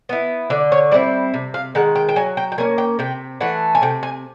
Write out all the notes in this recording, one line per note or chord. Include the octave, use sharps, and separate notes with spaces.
B3 E4
D3 D5
C#5
G3 C4 E4 D5
C3
F5
D#3 G#3 F#5
G5
G5
F#3 G#5
G5
G5
A#3 C#4 G#5
G5
C3 G5
E3 A3 F#5
G#5
C3 G5
G#5